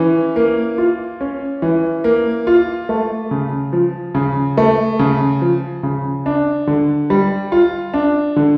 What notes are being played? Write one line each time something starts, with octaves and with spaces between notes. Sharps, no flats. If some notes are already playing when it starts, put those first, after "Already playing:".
Already playing: E3 C#4
A#3
F4
C#4
E3
A#3
F4
A3
C#3
F3
C#3
A3
C#3
F3
C#3
D4
D3
G3
F4
D4
D3